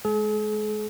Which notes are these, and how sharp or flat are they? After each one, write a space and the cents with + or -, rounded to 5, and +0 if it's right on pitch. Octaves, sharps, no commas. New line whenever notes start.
G#3 +20 G#4 +45